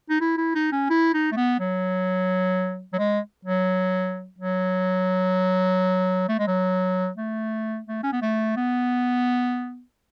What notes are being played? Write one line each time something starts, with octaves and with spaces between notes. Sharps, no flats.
D#4
E4
E4
D#4
C#4
E4
D#4
A3
B3
F#3
F#3
G#3
F#3
F#3
A3
G#3
F#3
A3
A3
C#4
B3
A3
B3